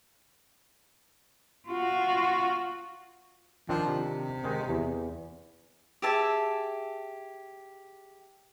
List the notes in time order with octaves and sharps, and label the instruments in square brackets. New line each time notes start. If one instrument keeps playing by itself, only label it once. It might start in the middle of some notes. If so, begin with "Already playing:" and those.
[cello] F4 F#4
[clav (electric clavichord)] D#3 C4 D4 [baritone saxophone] F3
[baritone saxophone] C3
[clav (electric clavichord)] D#3 G#3 D#4
E2
[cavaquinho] G4 G#4 E5 A5